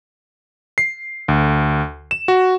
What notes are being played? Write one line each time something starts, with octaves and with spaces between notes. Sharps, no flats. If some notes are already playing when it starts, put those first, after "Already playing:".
C7
D2
E7
F#4